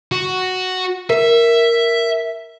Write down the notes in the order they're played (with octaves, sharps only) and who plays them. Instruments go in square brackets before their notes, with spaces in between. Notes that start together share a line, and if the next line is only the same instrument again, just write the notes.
[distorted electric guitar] F#4
[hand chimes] A#4 [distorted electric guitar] E5